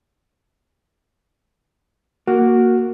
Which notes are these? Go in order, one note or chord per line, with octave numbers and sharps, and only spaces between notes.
A#3 F#4